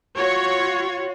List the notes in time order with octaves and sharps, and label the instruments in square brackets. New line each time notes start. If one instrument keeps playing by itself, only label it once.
[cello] F4 F#4 [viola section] C#5